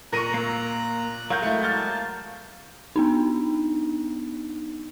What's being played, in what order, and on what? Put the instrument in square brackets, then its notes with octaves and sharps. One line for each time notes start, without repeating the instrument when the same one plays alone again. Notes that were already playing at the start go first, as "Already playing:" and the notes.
[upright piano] A#2 A#6 D#7 [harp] A#4 C#6 [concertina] A#5 F#6
[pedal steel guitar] A#3 E6
[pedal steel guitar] F#3 G#3 F#4 [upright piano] A#4 G6 [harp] F5
[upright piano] A3 E4
[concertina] A#3 A5 [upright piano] F6 G6 A6
[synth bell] B3 D4 D#4